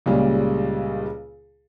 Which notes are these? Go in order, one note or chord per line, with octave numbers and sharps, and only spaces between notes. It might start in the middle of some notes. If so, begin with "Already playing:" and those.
C#2 A#2 C#3 G3